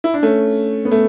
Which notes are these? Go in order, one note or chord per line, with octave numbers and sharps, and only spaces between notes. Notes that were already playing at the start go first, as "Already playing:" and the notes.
E4
D4
A3 C#4
B3
A3